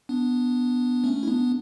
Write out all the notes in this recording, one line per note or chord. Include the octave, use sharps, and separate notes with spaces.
B3 D4
A3 C#4
E4
B3 D4